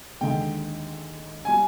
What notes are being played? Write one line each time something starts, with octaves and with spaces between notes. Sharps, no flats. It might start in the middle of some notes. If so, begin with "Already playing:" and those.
D#2 D3 G#3 G5
G3 G#5